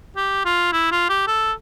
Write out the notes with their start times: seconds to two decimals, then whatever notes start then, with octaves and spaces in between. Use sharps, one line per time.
0.16 G4
0.45 F4
0.72 E4
0.91 F4
1.09 G4
1.27 A4